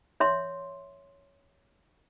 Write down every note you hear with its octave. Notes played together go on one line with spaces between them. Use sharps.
C#5 E5 C6